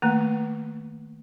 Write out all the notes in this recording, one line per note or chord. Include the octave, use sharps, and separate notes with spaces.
D#3 A3 A#3